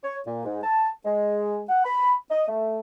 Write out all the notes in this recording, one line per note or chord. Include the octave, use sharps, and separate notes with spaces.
C#5
A#2
G#2
A5
G#3
F#5
B5
D#5
A3